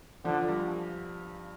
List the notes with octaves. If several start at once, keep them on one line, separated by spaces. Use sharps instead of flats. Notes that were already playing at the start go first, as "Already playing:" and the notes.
D3 F3
G2